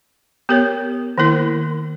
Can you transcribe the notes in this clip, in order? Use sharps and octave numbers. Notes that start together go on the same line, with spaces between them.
B3 G4 A#4 C#5
D#3 A#3 E4 A#4